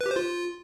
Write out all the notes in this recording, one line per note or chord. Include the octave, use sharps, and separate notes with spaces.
B4
G4
C5
F4